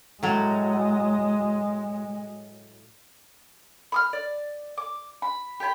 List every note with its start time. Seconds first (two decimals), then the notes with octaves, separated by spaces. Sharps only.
0.23 A2 F#3 G#3
3.92 B5 D#6 F6
4.13 D5
4.78 D6
5.22 B5
5.60 G4 G5 G#5 B5